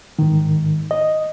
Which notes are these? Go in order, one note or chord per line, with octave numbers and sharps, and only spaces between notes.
G#2 D#3
D#5